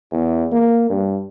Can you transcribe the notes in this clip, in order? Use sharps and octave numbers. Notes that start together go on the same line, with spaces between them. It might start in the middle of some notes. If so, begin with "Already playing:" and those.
E2
A#3
G2